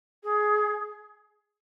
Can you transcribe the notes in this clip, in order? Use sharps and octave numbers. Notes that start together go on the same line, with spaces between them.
G#4